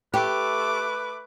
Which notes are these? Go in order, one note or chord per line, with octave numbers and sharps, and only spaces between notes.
A3 G4 B4 D6